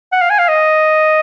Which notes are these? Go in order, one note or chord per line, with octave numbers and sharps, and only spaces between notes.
F#5
F5
G#5
F5
D#5